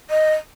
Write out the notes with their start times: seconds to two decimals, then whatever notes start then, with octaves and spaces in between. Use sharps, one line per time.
0.10 D#5